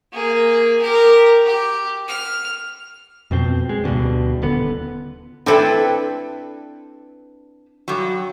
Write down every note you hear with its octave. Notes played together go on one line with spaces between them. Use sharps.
A#3 G#4
G4 A#4
G4
F6
F2 B2 C4
G#3
D2 G2 B2 D3
D#1 D3 B3
C4 D4 E4 A4 B4 G5
G2 F#3